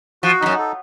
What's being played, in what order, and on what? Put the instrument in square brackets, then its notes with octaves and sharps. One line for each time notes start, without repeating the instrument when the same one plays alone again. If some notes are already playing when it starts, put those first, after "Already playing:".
[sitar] F3 [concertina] F#4
[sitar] G2 [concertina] D#4
[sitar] F#2
[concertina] A4